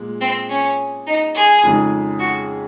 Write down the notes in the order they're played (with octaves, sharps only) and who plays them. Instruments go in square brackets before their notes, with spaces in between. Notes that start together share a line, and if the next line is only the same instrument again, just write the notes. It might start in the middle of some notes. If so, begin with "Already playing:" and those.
Already playing: [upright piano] A#2 G#3
[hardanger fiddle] C4
C#4
D#4
G#4
[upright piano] F2 C#3 G#3 D#4 G#4
[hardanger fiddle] F#4